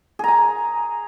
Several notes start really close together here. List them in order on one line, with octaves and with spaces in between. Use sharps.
G#4 A#5 G#5